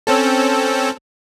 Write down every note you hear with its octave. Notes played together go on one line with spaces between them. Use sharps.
C4 C#4 A4